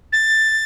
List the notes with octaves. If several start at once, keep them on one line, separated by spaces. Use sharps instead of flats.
A6